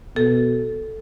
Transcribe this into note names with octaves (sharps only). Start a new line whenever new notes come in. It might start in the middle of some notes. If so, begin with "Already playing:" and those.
B2 A4